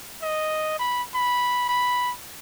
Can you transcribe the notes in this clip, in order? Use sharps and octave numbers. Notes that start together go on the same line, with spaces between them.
D#5
B5
B5
B5